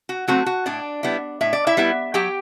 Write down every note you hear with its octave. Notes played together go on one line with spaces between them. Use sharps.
F#4
F#3 A3 C4 F#4
F#4
A2 D4 D5
G3 B3 E4
A2 E5
D5
E4 E5
G3 B3 E4
F#3 G4 G5